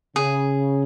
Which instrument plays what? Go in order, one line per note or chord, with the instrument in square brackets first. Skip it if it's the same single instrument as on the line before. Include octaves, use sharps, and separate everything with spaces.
[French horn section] C#3 [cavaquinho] G#4